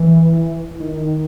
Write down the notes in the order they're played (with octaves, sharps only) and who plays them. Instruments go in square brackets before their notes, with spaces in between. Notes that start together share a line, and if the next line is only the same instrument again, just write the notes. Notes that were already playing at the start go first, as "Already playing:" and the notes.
Already playing: [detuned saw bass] E3
D#3